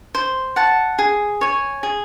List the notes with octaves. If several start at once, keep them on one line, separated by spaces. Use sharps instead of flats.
C5
F#5 A5
G#4
C#5 G#5
G#4